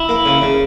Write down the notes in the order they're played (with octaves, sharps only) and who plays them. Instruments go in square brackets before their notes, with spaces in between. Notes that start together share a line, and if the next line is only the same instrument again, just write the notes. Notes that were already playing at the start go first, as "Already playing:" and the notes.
Already playing: [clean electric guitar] E4
[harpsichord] A#3
C#3
C#3